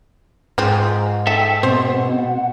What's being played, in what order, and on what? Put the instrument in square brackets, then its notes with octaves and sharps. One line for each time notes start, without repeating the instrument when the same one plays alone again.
[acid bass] G#2 [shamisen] G#3 C4 F4
[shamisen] D#4 [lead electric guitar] A4 E5 [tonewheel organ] G5 E6
[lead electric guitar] B2 [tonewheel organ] B3 C4 [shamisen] C5
[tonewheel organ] F#5